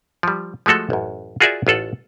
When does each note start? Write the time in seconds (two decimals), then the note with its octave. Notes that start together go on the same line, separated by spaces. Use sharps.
0.23 F3 G3
0.66 F3 G#3 A3 F#4 A4
0.90 A1 F#2
1.41 F4 F#4 G#4 A#4 D5 E5
1.67 A1 F4 A4 F#5